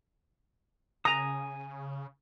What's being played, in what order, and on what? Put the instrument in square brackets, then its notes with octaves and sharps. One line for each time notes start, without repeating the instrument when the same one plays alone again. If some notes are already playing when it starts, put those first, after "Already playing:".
[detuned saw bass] C#3 [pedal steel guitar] G#5 D#6 [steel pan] A#5